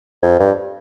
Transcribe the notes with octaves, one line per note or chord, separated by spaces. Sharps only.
F2
G2